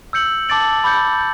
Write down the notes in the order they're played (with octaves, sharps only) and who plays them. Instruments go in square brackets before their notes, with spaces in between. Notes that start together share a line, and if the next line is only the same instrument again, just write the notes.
[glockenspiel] E6 G6 C#7 F#7
A5 D6 A6 D7 F#7
B5 D6 G6 C#7
G6